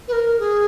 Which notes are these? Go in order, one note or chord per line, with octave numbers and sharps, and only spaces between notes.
B4
A#4
G#4